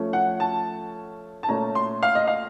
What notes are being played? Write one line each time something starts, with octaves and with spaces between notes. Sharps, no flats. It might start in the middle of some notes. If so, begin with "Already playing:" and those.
Already playing: F3 A3 C#4
F#5
A5
A5
A#2 A3 C#4 A#5
C6
F5
D#5
F5